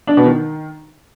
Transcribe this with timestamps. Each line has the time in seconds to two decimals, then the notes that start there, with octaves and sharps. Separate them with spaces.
0.07 D4
0.17 B2
0.27 D#3